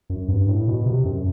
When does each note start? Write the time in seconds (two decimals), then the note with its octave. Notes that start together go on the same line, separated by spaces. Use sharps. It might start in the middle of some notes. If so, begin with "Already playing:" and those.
0.10 F#2
0.29 G2
0.48 A2
0.68 B2
0.86 C3
1.05 F#2